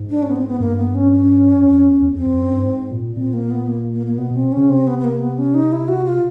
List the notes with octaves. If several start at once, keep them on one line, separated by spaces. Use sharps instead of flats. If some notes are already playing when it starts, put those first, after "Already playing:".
Already playing: G#2
D4
C#4
B3
C4
B3
G2 A#3
B3
C#4
C#4
F#2
F2
E2
E2
F2 C4
F2
F#2
G2
G#2
A#2
A#2 C4
A#3
B3
A#3
A#3
A#3
B2 B3
B2 C4
C#3 C#4
C3 C4
B3
B3
A#3
B3
C#4
D#4
E4
F#4
F4